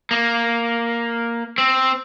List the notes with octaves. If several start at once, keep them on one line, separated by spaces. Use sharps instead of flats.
A#3
C4